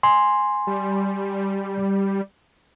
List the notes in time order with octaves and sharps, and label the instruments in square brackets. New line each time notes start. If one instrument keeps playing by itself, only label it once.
[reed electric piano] G#5 C6
[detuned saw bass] G3